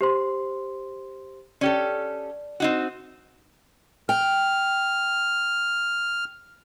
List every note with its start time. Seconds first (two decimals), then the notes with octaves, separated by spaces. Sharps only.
0.01 G4 C5 C6
1.61 C#4 G4 A4 D5
2.60 C4 D#4 F#4
4.09 G5 F6